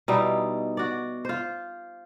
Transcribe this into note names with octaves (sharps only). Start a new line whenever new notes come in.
B2 G3 D#4 E4
F#4 D5
F4 C5